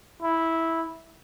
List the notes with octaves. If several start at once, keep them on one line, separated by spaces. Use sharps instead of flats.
E4